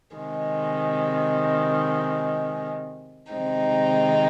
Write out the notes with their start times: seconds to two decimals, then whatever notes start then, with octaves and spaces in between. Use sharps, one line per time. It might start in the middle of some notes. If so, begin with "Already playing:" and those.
0.16 C3 D#3 G#3
3.33 C3 D#3 G#3 C4 D#4